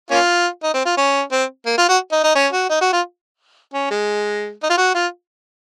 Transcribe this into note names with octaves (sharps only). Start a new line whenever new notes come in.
A#3 C#4 F4
D#4
C4
F4
C#4
C4
A#3
F4
F#4
D#4
D#4
C#4
F#4
D#4
F#4
F4
C#4
G#3
D#4
F4
F#4
F4